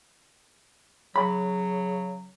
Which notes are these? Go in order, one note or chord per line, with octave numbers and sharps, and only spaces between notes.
C#3 F#3 B5